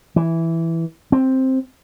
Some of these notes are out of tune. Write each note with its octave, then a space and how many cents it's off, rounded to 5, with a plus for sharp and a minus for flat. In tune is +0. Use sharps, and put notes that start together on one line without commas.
E3 +0
C4 +5